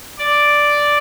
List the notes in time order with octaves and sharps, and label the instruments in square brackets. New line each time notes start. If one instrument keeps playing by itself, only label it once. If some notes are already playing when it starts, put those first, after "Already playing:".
[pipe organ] D5